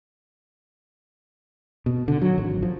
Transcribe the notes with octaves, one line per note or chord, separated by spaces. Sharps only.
B2
D3
F#3
G#1
F3